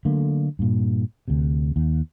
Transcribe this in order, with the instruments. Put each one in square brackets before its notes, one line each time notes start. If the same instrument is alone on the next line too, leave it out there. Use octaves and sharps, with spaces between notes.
[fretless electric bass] D3 F#3 A3 A#3
G2 A#2
D2 C3
D#2